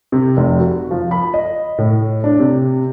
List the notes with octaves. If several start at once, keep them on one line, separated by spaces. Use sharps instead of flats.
C3
F1
F#4
F3
B5
D#5
A2
D4
C3